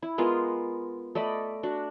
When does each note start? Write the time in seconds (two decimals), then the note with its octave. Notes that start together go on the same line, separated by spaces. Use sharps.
0.02 E4
0.18 G#3 B3 F4 A#4
1.15 A3 D5 D#5 B5
1.63 D4 F#4